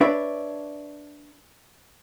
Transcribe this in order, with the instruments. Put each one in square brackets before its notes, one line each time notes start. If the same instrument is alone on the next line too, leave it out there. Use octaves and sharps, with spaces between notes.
[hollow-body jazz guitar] D4 B4 C#5 D5 E5